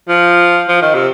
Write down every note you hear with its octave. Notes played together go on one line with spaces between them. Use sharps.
F3
F3
D#3
C3